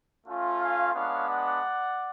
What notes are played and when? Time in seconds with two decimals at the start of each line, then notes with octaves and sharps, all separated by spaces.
0.25 A3 C#4 F4
0.60 F5 G#5
0.94 G#3 B3 D4 C#5 F5
1.28 D5 F#5